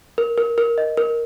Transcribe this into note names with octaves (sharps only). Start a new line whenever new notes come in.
A#4
A#4
A#4
D#5
A#4